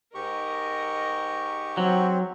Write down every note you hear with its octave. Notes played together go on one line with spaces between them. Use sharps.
G#2 G4 A#4 D#5 C#6
F#3 C4